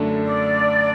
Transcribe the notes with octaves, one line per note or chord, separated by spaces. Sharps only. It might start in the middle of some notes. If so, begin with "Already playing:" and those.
Already playing: F#2 D3 A3 D4 A4
D5